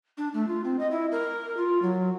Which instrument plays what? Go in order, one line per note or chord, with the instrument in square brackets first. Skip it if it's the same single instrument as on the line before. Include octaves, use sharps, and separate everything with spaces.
[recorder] D4
A3
F4
C4
D#5
E4
A#4
F4
F#3